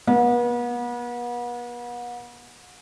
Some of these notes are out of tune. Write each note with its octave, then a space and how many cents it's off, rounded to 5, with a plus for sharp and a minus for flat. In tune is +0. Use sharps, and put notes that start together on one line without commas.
B3 -40